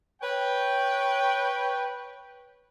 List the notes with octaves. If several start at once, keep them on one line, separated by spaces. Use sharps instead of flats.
B4 C#5 G5